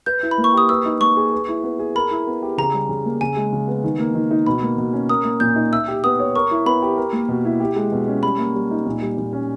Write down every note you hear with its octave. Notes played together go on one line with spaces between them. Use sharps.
B4 G6
E4
B5
A#3
C#6
G4 D#6
B4 E6
D#4
A#3 C#6
G#4
B4
E4
B3
G#4
A#4 B5
E4
B3
G4
C#3 A#5
G3
C#3
A#3
C#3 G#5
G#3
C#3
B3
D#3
A#3
D#3
D#4
B2 B5
A#3
B2
C#4
A#4 D#6
A#3
A#2 G6
D#4
E5 E6
G4
B3 D#6
C#5
A#4 C#6
E4
B3 B5
G4
A#4
A#3
B2
E4
G4
G#3
B2
C#4
G3 B5
A#3
G3
D#4
A#2
G3
A#2
C#4